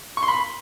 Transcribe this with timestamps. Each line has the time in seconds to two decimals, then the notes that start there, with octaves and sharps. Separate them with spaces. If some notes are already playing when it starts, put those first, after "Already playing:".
0.17 C#6
0.23 C6
0.28 B5